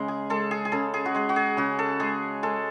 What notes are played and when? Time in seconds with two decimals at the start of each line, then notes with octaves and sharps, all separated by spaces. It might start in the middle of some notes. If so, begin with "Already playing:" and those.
Already playing: C#3 G#3
0.08 G#4
0.30 G#3 A4
0.51 G#4
0.65 G#4
0.72 C#3 A4
0.94 G#4
1.05 F#4
1.14 G#3 G#4
1.29 F#4
1.36 G#4
1.57 C#3 F#4
1.79 A4
2.00 G#3 G#4
2.43 G#3 A4